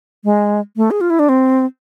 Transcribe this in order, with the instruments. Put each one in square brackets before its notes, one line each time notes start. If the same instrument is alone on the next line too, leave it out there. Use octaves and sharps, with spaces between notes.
[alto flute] G#3
A3
G#4
F4
E4
D4
C4